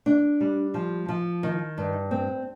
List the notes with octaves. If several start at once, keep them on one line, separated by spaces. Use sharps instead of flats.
D4
G3
F3
F3
D#3
G2
C4